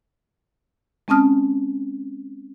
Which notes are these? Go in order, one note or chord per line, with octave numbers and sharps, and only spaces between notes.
G#3 C4 C#4 A5 D#6 F6